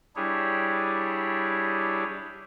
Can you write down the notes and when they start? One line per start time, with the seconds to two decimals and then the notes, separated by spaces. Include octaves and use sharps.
0.16 G3 D4 E4 G4 G#4 C#5